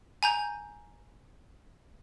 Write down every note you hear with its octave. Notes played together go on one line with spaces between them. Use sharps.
G#5 A#5 G6